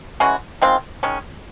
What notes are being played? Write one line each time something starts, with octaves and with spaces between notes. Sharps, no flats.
E3 G#3 C#4 F#4
D#3 G#3 C4 F4
D#3 G#3 C#4